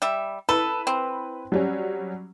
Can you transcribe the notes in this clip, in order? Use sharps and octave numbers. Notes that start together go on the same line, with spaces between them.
G3 E5
E4 A4 B4
C4
F#3 G3 C#4